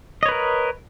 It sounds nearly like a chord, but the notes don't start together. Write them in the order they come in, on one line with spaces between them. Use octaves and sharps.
D#5 C#5 B4 A#4